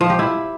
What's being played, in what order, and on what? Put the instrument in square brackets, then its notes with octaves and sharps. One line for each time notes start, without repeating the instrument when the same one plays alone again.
[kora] F3
G4
E4